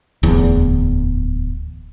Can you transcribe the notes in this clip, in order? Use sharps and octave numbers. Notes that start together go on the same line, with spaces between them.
D1 E2